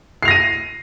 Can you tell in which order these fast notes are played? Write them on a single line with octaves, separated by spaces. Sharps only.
C7 F7 A#6 D#7